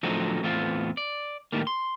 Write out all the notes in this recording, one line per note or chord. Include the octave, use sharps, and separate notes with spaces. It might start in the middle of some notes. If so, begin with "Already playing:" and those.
A2 D3 F3 F#3 C4 D#4
E2 A2 B3 C4 F4
D5
A2 D#3 G3 A#3
C6